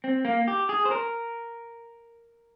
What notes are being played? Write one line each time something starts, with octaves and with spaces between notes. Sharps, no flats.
C4
A#3
G4
G#4
C5
A#4